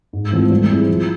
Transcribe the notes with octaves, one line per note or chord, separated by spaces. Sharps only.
G#2
E3 A3 C4 F4
G3
C4 E4 G#4
F3